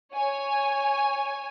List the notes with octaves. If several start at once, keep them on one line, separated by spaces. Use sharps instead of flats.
C#5 G#5